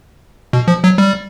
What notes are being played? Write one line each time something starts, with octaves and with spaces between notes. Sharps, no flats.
B2
F3
F#3
G3